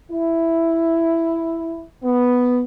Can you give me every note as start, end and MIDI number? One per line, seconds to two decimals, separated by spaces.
0.11 1.82 64
2.03 2.61 59